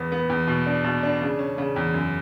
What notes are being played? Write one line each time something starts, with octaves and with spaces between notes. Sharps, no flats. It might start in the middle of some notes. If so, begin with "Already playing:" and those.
Already playing: E2 B3
B3
E2
B2
D4
B2
D4
C#3
C#4
C#3
E2
F#2